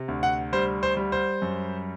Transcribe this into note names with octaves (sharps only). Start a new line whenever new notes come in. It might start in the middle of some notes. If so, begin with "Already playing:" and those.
Already playing: C3
D2
F#5
G3 C5
C5
G3
C5
F#2